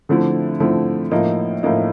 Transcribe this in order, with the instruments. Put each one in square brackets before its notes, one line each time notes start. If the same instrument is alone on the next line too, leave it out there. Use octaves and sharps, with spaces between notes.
[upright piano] D3 F3 A3 C4 E4
D3 F3 A3 C4 E4
A2 F3 A#3 D#4
A2 F3 A#3 D#4